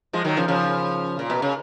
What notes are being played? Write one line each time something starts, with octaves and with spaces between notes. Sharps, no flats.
F3 G#3
D#3 F#3
C#3 F3
C#3 F3
A#2
B2
C#3